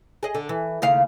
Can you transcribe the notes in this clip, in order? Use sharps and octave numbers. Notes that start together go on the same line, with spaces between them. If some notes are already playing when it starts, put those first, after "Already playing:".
G#4 D#5
D3
E3
D#2 C#3 F5